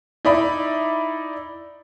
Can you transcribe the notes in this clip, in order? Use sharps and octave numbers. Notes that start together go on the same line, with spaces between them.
D#4 E4 D5 E5 B5